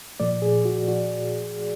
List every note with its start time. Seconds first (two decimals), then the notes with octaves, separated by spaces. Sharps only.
0.20 A#2 F3 A3 D5
0.42 G#4
0.65 F#4
0.88 F#4